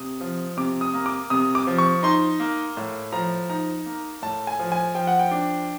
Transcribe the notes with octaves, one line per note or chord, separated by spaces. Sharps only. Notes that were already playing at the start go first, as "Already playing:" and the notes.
Already playing: C3 D#6
F3
C3 D6
D#6
A#3
D6
C3 D#6
D6
F3
C#6
D#4 C6
A#3
A2
F3 A#5
D#4 A#5
A#3
A2 A5
G#5
F3
G#5
F3 G5
F#5
G5
D4